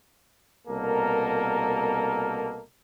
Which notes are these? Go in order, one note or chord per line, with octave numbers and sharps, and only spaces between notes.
C2 B2 A#3 A4 A#4